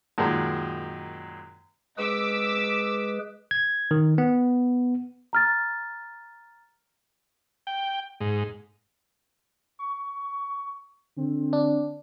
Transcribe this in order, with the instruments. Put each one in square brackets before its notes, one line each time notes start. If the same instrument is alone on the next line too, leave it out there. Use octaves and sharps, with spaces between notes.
[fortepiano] F#2 A#2 D#3 G#3
[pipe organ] G#3 G#4 B4 [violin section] D6 E6 B6
[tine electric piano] G#6
D#3
B3
[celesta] A#5 F6 A6
[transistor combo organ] G5
G#2
[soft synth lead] C#6
[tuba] D3 [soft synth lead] C4
[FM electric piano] D4